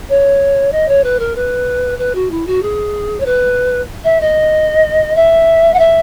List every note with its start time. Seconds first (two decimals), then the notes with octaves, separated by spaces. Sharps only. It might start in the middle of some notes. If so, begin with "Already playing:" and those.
0.09 C#5
0.71 D#5
0.88 C#5
1.03 B4
1.19 A#4
1.35 B4
1.98 B4
2.14 F#4
2.30 E4
2.46 F#4
2.62 G#4
3.20 C#5
3.25 B4
4.04 E5
4.20 D#5
5.15 E5
5.73 F#5
5.78 E5